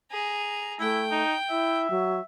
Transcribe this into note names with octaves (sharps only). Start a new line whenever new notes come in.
G#4 A#5
A3 E4 G5
D#4
E4 E5
F#3